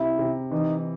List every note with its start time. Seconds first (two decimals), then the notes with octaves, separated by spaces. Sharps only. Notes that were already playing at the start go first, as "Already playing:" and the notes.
Already playing: C3 E4
0.19 C3
0.51 E3 D#4